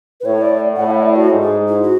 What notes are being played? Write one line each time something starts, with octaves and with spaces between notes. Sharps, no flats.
B4
A2 C#5
D5
A2 F#5
E5
D5
F#4
G#2
G#4
E4
F#4